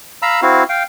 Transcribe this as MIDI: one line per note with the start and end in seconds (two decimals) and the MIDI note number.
0.22 0.40 77
0.22 0.40 82
0.22 0.40 83
0.22 0.40 88
0.42 0.64 60
0.42 0.64 64
0.42 0.64 66
0.42 0.64 77
0.69 0.83 77
0.69 0.83 79